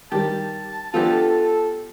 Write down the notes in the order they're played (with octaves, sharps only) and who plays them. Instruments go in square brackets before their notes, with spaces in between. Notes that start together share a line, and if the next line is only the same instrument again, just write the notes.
[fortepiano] D#3 G3 [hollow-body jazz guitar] G4 [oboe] A5
[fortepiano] F3 B3 D4 [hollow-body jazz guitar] F4 G4 [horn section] A4